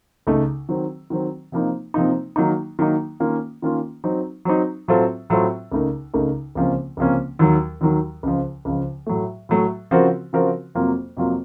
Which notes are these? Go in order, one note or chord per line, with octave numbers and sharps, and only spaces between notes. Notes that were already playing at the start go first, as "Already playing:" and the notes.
C#2 C#3 A3 D#4 A4
D#3 F#3 C4
D#3 F#3 C4
C3 F3 A#3 D#4
C3 F3 A#3 D#4
D#3 F#3 A#3 D#4
D#3 F#3 A#3 D#4
D#3 A#3 C#4 F4
D#3 A#3 C#4 F4
F#3 C4 D#4
F#3 C4 D#4
A2 F#3 C4 F4 A4
A2 F#3 C4 F4 A4
C#2 C#3 A3 D#4 A#4
C#2 C#3 A3 D#4 A#4
C#2 C3 F3 A#3 C#4
C#2 C3 F3 A#3 C#4
D#2 D#3 F#3
D#2 D#3 F#3
C#2 C#3 F3
C#2 C#3 F3
A2 F#3 A3
A2 F#3 A3
C#3 F3 C4 F#4 A#4
C#3 F3 C4 F#4 A#4
F2 C3 F#3 A#3 F4
F2 C3 F#3 A#3 F4